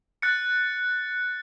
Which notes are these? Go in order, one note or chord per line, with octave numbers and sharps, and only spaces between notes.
F#6 A6 C#7